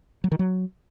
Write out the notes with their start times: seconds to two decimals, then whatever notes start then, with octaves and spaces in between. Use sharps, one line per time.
0.24 F#3
0.32 D#3
0.39 F#3